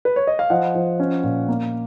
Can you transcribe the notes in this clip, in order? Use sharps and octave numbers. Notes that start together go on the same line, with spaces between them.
B4
C#5
D#5
F5
F3 D#5 F#5
F3
C#4
A#2
A#3